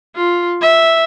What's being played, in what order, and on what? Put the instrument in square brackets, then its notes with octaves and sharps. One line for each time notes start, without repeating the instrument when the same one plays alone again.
[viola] F4
E5